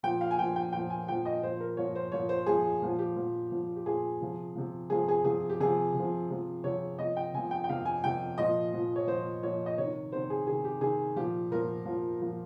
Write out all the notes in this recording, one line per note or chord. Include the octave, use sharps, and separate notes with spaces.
A#2 F3 G5
F5
G#5
A#2 F3 G5
G5
A#2 F3 G5
G#5
A#2 F3 G5
D#5
A#2 F3 C5
A#4
A#2 F3 C#5
C5
A#2 F3 C#5
C5
A#2 F3 G#4
A#2 F3
G4
A#2 F3
A#2 F3
G4
A#2 F3 G#4
C3 F3
C3 F3
C3 F3 G#4
G#4
C3 F3 G#4
G4
C3 F3 G#4
C3
F3
C3 F3
C3 F3 C#5
C3 F3 D#5
G5
C3 F3 G#5
G5
G5
C3 F3 F5
G#5
C3 F3 G5
A#2 F3 D#5
A#2 F3
C#5
A#2 F3 C5
A#2 F3 C#5
D#5
C3 D#3 C#5
C3 D#3 C5
G#4
C3 D#3 G#4
G4
C3 D#3 G#4
A#2 F3 G4
A#2 F3 A#4
A#2 F3
A#2 F3